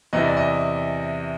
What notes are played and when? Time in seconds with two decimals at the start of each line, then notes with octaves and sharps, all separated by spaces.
0.13 E2 C3 E3 D#5
0.24 D5
0.37 D#5